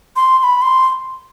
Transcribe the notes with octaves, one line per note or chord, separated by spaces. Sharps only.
C6
C6
B5
C6